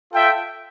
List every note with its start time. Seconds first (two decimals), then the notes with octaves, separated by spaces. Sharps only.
0.12 F4 A4 E5 G5